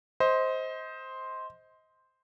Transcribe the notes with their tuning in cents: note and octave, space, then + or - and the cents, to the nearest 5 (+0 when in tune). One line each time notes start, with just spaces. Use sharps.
C5 +0 D#5 +25